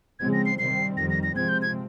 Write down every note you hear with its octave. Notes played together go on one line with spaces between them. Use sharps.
C#3 F3 G#3 C4 G#6
A#6
C7
C3 D#3 G3 C4 C7
F2 D#3 G3 A#6
A#6
A#6
C3 F3 G#3 C4 G#6
G6
G#6